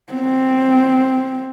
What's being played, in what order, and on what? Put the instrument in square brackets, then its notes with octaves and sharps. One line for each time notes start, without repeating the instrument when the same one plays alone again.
[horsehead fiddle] C4